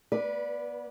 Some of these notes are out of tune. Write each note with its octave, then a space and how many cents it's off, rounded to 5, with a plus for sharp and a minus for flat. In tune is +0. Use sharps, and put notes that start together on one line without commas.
B3 -30 B4 +0 D5 +0